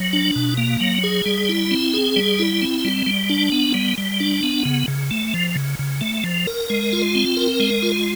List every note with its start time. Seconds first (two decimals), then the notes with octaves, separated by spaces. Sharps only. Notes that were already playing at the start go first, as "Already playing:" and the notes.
Already playing: F#3
0.13 D4
0.36 B2
0.57 A#3
0.80 F#3
1.03 G#4
1.26 G3
1.49 E4
1.71 C4
1.94 G#4
2.16 G3
2.39 E4
2.62 C4
2.85 G3
3.06 G3
3.30 D4
3.52 B3
3.74 G3
3.98 G3
4.20 D4
4.43 B3
4.65 C#3
4.88 C#3
5.11 A3
5.34 F3
5.55 C#3
5.79 C#3
6.01 A3
6.24 F3
6.47 A#4
6.70 G#3
6.92 F4
7.15 C4
7.37 A#4
7.60 G#3
7.83 F4